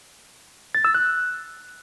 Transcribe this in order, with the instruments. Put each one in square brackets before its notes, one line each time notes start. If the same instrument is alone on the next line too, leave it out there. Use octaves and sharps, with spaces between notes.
[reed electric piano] A6
E6
F#6